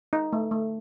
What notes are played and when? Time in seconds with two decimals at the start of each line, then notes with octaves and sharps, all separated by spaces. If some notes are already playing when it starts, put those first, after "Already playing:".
0.13 D#4
0.33 A3
0.51 A3